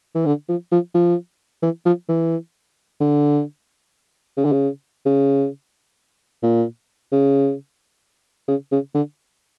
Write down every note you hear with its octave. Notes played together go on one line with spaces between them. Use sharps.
E3
D3
F3
F3
F3
E3
F3
E3
D3
C#3
D3
C#3
C#3
A#2
C#3
C#3
C#3
D3